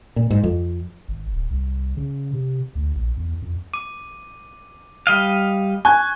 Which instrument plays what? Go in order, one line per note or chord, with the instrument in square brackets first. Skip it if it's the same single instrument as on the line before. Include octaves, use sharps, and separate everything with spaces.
[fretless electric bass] A#2
G#2
F2
[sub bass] G#1
D1
C2
C#3
C3
D2
A#1
E2
F2
[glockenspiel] D6 D#7
[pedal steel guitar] G3 D#5 F5
[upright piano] G#5 [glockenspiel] C#6 F#6 G#6